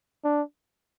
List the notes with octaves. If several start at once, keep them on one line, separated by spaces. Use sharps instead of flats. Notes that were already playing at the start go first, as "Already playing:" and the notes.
D4